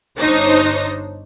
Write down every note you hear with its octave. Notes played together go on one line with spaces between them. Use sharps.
G1 D4 D#4 C5 C#5 A#6